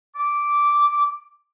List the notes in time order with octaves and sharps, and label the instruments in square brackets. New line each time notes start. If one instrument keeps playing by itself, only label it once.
[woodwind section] D6